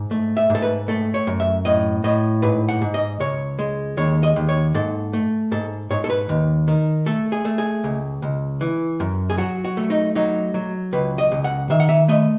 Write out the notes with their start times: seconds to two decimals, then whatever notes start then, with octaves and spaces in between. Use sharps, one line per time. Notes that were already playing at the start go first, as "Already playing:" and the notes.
Already playing: G#2
0.11 A3
0.37 E5
0.50 G#2
0.55 A4
0.62 B4
0.88 A3 A4
1.14 C#5
1.27 F#2
1.40 E5
1.65 A2 D#5
2.04 A2 D#5
2.42 G#2 B4
2.69 F#5
2.81 G#2
2.94 D#5
3.20 C#2 C#5
3.59 G#3
3.97 D#2 C#5
4.23 D#5
4.36 D#2
4.49 C#5
4.74 G#2 A4
5.13 A3
5.52 G#2 A4
5.91 G#2 C#5
6.04 A4
6.10 B4
6.29 D#2
6.68 D#3
7.06 A3 A4
7.32 G#4
7.45 A3
7.58 G#4
7.84 C#2
8.22 C#2
8.61 E3
9.00 F#2
9.30 G#4
9.38 F#3 F#4
9.64 F#4
9.77 A3
9.90 D#4
10.15 F#3 D#4
10.54 F#3
10.93 C#2 B4
11.18 D#5
11.32 C#2
11.44 F#5
11.70 D#3 E5
11.80 F#5
11.89 E5
12.08 A3 D#5